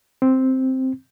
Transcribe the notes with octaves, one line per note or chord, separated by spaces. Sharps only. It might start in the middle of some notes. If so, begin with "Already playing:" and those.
C4